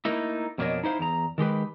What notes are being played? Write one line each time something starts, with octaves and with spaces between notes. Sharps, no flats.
A3 A#3 D#4 E4
F2 B2 A#3 D4 C#5 D#5
D#4 E4 C5 F5
E2 A#5
D#3 G#3 G4 B4